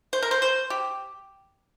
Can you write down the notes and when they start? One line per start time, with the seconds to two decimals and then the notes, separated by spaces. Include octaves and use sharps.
0.13 C5
0.22 A#4
0.31 C5
0.42 C5
0.70 G4